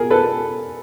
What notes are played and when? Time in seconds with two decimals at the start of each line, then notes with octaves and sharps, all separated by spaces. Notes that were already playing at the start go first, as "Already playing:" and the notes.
Already playing: B2 G#4 A#4
0.10 A4 B4